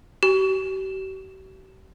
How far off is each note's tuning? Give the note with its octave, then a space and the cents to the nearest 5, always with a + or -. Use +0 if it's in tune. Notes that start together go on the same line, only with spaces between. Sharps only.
G4 -45